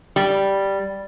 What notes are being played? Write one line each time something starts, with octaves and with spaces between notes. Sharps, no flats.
G3